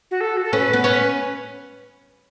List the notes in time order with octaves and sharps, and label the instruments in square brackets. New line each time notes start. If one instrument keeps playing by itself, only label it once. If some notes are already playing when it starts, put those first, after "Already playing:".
[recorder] F#4
A4
F#4
A4
[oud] C#4 [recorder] B4
[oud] B3
[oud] C#4 [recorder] B4